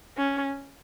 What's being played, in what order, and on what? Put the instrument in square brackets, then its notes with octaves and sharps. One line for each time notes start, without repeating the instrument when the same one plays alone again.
[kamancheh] C#4